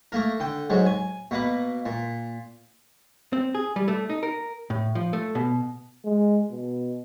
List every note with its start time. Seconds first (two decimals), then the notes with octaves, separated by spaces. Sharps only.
0.12 A3 A#3 A#4
0.40 D3 G5
0.70 G#2 F#3 G#3
0.86 G#5
1.31 B2 A#3 B4
1.86 A#2
3.33 C4
3.55 G#4
3.76 G3
3.88 A3
4.10 D#4
4.23 A#4
4.70 A2
4.95 F3
5.13 A3
5.35 B2
6.05 G#3
6.51 B2